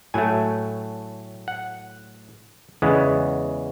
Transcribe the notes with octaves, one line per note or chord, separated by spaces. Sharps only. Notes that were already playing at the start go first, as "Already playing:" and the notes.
A2 F#3 A3 G#5
F#5
E2 C#3 G#3 B3